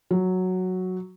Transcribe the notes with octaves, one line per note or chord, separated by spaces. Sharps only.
F#3